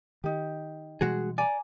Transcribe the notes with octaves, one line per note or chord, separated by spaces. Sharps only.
D#3 D#4 G4
B2 E3 G3 G#3 F#4 G#4
D5 G#5 A#5